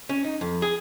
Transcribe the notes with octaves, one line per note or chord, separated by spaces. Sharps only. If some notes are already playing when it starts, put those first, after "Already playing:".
C#4
D#4
F2
G#4